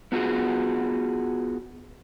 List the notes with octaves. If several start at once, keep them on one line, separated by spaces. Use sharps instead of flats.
B3 F4 F#4 G#4